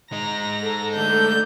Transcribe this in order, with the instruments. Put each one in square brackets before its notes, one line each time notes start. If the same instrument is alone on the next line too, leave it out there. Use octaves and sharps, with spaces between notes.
[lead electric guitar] G#3 D#4 [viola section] A#5 [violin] A#6
[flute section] A4
[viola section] D3 A3 [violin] G6